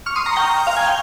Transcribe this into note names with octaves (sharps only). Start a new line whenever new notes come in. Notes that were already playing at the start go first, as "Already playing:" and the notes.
C#6 F6
C6 D#6
A#5 C#6
G5 A#5
F5
G#5
G5